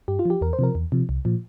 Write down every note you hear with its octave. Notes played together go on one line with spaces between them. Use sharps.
G2 G4
F4
F3 G4
E2 A#4
C5
C3 F3 A#4
E2
C3 F3
C2
A#2 F3